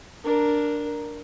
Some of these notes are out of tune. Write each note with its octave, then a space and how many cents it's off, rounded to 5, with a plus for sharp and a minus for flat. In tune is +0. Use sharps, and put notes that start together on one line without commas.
D4 +0 A#4 +0